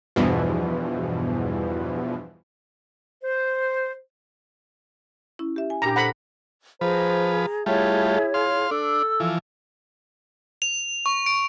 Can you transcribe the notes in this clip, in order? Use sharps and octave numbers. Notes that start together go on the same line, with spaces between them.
E2 G2 B2 E3 F3
C5
C#4 E4
G4 E5
G#5
A#2 D4 G4 A#5 B5
A4 C5 F#5 A#5 B5
F3 G#4 B4 C5 A#5
G3 A3 E4 F4 G#4 C#5 E5
F5 C6
D4 A4 E6
E3 F3
F7
C#6
D7